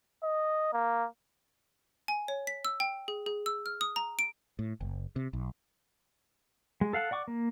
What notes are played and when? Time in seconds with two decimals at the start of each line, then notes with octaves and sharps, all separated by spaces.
0.23 D#5
0.73 A#3
2.08 G#5
2.28 C#5
2.47 B6
2.65 E6
2.80 G5
3.08 G#4
3.26 G#4
3.46 E6
3.66 F6
3.81 D#6
3.96 A#5
4.19 D7
4.59 A2
4.81 F#1
5.16 C3
5.33 B1
6.81 G#3
6.93 A4 F5 F#5 A5
7.11 D5 F#5 C#6 D6
7.28 A#3